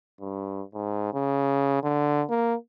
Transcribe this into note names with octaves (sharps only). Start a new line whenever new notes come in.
G2
G#2
C#3
D3
A#3